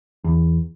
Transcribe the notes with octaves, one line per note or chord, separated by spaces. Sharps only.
E2